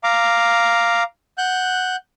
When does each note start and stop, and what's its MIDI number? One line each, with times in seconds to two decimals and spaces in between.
0.04 1.03 77
0.04 1.03 82
0.04 1.03 86
1.38 1.96 78
1.38 1.96 90
1.38 1.96 91